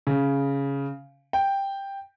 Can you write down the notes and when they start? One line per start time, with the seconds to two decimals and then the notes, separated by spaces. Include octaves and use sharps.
0.07 C#3
1.33 G5